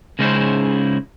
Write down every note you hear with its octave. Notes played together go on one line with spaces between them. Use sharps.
C#3 G#3 C#4 D#4 E4 C5